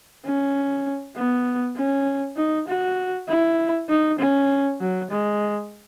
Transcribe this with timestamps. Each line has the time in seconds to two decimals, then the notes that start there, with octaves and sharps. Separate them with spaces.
0.25 C#4
1.16 B3
1.76 C#4
2.37 D#4
2.68 F#4
3.28 E4
3.89 D#4
4.19 C#4
4.80 F#3
5.10 G#3